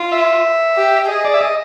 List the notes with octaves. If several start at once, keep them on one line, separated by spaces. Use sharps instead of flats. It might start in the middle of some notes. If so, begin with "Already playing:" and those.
Already playing: F4
E5
G4
G#4 D#5
D5
E5
D#5